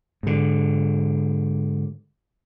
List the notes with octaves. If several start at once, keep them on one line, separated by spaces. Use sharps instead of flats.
G#2 D3